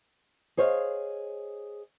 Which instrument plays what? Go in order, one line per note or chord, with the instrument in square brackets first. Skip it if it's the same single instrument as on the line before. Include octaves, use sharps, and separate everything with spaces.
[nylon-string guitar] G#4 C5 C#5 D#5 F5